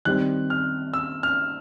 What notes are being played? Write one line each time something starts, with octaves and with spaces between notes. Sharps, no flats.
D#3 G3 C4 F#6
F6
E6
F6